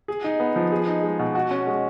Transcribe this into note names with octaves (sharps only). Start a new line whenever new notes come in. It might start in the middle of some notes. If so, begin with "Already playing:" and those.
G#4
D#4
B3
F3
G#4
D#4
G#3
B2
F#4
C#4
G#3